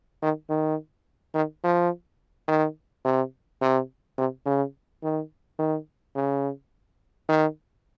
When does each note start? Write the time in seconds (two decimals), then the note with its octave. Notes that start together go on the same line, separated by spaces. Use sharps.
0.22 D#3
0.50 D#3
1.35 D#3
1.64 F3
2.48 D#3
3.05 C3
3.62 C3
4.18 C3
4.46 C#3
5.03 D#3
5.59 D#3
6.15 C#3
7.29 D#3